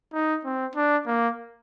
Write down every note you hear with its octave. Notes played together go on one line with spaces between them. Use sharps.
D#4
C4
D4
A#3